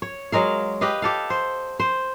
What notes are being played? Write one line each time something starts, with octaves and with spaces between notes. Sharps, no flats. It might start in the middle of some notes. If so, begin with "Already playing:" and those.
C#5
F#3 G#3 A#4 F5
G4 B4 D#5 F5
G4 A4 F5
C5
C5